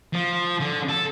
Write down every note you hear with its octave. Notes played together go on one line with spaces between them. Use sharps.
F3
D3
A4